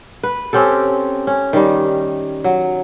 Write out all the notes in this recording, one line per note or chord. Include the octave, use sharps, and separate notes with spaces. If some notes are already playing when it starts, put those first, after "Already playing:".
B4
C4 C#4 G4 A4
C#4
D#3 G3
F#3